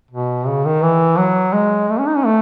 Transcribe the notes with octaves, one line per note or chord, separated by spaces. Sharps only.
B2
C#3
D#3
E3
F#3
G#3
A3
C#4
D#4
C#4
A3